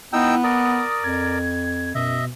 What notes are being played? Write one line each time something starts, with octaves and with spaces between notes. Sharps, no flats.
B3 D#4 E4 G5 E6
A#4 D5 D#6
F2 G#6
F#2 B2 D#5 E5